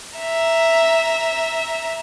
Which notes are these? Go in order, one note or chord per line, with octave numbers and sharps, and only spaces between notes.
E5 A#5